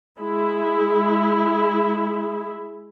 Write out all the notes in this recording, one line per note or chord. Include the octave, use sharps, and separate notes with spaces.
G#3 E4